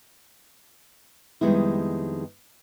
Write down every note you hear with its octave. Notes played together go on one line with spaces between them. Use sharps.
F2 D#3 G3 G#3 B3 E4